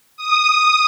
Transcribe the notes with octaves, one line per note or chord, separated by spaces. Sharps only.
D#6